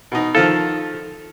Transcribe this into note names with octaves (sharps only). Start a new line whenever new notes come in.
B2 D#4
D#3 F3 F4 A4